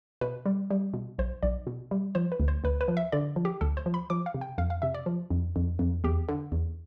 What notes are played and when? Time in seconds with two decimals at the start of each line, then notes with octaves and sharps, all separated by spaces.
0.21 B2 B4
0.46 G3
0.70 G3
0.94 B2
1.18 B1 C5
1.43 B1 D5
1.67 B2
1.91 G3
2.15 F3 C5
2.32 B4
2.40 D2
2.48 C5
2.64 D2 B4
2.81 B4
2.88 F3
2.97 E5
3.12 D3 D5
3.36 F3
3.45 G4
3.61 D2 A4
3.77 C5
3.86 F3
3.94 B5
4.10 F3 D6
4.26 F5
4.34 C3
4.41 G5
4.58 F2 F5
4.70 F5
4.82 C3 E5
4.94 D5
5.06 F3
5.30 F2
5.56 F2
5.79 F2
6.04 E2 G4
6.28 D3
6.52 E2